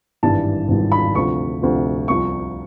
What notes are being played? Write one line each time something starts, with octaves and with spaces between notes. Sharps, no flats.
G#1 G2 E3 G3 A5
G#1 G2 E3 G3
B5
D2 C3 F3 C#6
D2 C3 F3
C2 C3 F3 C#6